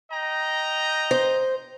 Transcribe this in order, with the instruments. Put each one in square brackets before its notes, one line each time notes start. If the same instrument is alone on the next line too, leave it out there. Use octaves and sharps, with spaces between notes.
[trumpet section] D#5 G5 A#5
[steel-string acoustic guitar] C5